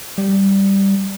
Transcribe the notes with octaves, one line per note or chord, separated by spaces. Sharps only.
G3